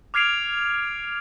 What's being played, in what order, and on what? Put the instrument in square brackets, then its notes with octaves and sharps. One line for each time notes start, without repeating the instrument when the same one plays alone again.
[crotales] D6 F6 G#6 C7 D7 F7